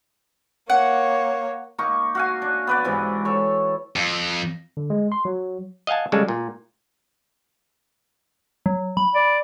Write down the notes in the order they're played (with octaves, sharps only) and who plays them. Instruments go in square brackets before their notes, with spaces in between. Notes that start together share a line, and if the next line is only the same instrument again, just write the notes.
[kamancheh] A#3 C#5 [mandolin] F#5
[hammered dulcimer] A#3 D#4 C#6
F#4 F5 G#5
D4
B3 B4 D5
G#2 C3 E3
A4 C#5
[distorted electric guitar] F2
[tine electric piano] D3
G#3
C6
F#3
[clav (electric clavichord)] D#5 F5 F#5 G#5 A5
C#3 G3 G#3 A4
A#2
[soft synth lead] F#3
B5
[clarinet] D5